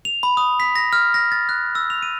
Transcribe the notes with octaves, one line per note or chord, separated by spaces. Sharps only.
F7
B5
D#6
B6
A#6
F6
A#6
A6
F#6
E6
F7
D#7